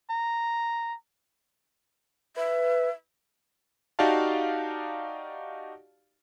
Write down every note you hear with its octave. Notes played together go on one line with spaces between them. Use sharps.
A#5
B4 E5
D#4 F#4 G4 D5 F5 A5